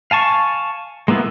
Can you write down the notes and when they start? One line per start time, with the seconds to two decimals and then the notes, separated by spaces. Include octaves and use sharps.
0.11 F5 G#5 A5 C#6
1.08 G#3 A#3 B3 E4 F4